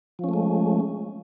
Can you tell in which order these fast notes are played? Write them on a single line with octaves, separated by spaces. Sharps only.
F3 C#4 A3 G#3